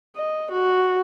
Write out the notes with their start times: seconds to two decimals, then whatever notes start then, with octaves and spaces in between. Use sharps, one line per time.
0.16 D#5
0.51 F#4